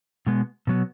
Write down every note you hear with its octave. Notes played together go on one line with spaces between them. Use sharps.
B2 G#3 B3
B2 F#3 B3